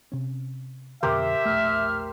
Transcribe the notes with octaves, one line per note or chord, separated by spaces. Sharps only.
C3 C#4
F2 B2 D3 G4 A#4 C5 E5
E1 A#1 A3 F6